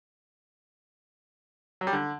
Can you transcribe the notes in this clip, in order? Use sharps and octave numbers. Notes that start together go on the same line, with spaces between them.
F#3
G3
D3